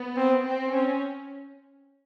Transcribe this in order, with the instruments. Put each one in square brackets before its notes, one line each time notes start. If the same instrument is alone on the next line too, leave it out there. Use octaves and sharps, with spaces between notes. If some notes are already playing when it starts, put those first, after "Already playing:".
Already playing: [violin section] B3
[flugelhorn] C4
[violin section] C4
[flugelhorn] C4 [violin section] C#4